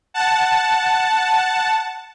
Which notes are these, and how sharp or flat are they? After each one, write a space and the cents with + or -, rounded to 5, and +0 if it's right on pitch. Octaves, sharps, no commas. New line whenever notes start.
F#5 +0 A5 +0